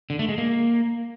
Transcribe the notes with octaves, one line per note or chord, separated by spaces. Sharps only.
D3
A3
G#3
A#3